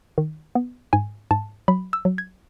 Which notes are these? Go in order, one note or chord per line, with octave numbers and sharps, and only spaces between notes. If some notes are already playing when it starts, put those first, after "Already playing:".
D#3
B3
G#2 G#5
G#2 A5
F#3 B5
E6
F#3
G#6